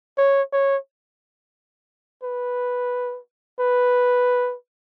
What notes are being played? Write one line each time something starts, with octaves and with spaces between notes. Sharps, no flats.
C#5
C#5
B4
B4